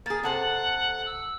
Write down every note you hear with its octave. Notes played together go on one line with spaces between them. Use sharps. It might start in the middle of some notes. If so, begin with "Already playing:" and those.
A#3 G#4 A6
C3 A4 C5 F#5
E6